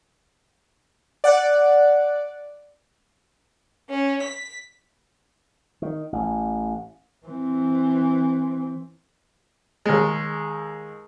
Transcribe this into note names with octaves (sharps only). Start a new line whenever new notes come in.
D5 F#5 F#6
C#4
B6
D#3
A1
E3 C4
D#2 G#3